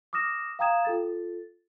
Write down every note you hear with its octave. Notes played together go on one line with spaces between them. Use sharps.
D6 D#6 F6 A#6 E7
F5 G5 A#5 D#6 G#6 E7
F4 A4 A6